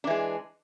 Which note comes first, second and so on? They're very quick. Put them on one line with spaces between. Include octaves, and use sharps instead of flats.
D4 E3 G#3